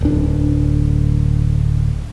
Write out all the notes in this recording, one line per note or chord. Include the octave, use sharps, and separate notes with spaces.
D1 D4